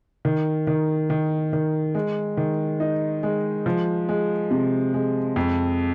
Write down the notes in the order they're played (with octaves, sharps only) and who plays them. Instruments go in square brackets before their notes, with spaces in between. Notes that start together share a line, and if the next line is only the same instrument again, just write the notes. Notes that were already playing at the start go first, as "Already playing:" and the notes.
[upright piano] D#3
D#3
D#3
D#3
G#3
D#3
D#4
G#3
F3
G#3
C3
G#3
F2